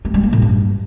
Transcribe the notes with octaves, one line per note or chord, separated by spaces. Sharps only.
A3
G3
A#3
A2
G2